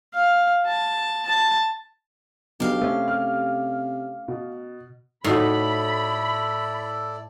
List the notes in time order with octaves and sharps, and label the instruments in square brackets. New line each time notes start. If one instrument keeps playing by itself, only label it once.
[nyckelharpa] F5
A5
A5
[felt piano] B1 D4 [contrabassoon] B2 [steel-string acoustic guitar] G4 F5
[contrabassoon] C3 [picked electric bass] A3 C#4 [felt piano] C5
[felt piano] F6
B2
[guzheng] A2 [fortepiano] D#4 F#4 [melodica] E4 A4 D5 [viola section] B5